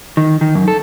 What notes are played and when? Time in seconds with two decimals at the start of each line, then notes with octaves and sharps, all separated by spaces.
0.17 D#3
0.41 D#3
0.55 F#2
0.68 A4